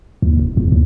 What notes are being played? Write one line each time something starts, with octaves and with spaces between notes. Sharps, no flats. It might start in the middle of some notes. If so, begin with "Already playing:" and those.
D#2
F1
E2
D#2